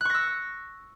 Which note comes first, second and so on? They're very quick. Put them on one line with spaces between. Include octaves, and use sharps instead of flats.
F#6 C#6 A#6 E6